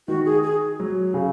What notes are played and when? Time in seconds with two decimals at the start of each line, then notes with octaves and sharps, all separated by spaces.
0.08 D#3 F#4
0.25 G#4
0.43 G#4
0.80 F#3
1.14 C#3